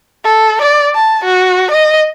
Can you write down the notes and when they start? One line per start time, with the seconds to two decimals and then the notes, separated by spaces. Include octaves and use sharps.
0.24 A4
0.62 D5
0.95 A5
1.25 F#4
1.71 D#5